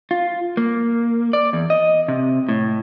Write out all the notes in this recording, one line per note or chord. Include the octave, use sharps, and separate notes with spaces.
F4
A#3
D5
E2
D#5
C3
A2